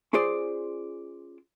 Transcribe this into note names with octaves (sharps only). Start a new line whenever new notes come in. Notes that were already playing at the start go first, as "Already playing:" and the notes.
C#4 F4 G#4 C5 D5